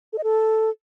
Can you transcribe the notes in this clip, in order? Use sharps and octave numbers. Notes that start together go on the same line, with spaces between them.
A4
D#5
A4